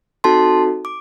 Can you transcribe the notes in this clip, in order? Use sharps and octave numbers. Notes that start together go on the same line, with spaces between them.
C4 D#4 F#4 A4 A5 C6
D6